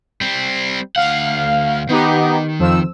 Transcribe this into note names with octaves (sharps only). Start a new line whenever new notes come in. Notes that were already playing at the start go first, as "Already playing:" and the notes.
G3 C4
D2 F5 F#5
D#3 B3 D#4 G4
F2 F3 E6